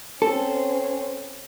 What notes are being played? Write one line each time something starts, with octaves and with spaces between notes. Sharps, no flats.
C4 C#4 A4